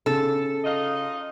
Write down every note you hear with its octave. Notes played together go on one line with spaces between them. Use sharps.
C#3 A4
D#4 F4 D#5